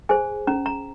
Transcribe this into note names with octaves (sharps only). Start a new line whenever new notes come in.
G#4 C5 G#5
C#4 A#5
A#5